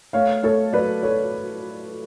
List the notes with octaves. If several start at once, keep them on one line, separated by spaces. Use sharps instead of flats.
A3 C#5 F5
A3 A4 C#5
F#3 B4 D5
A4 C#5